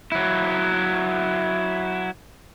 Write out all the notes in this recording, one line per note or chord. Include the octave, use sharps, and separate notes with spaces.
F#3 E4